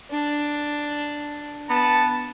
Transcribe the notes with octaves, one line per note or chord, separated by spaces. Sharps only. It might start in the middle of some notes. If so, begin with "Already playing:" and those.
D4
B3 A5